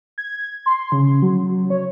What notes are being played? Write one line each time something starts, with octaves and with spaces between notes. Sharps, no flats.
G#6
C6
C#3
F#3
C#5